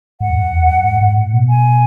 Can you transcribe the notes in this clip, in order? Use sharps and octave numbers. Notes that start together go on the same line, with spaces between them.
G#2 F#5
E2
F#2
E2
F#2
G#2
G#2
A2
B2
G#5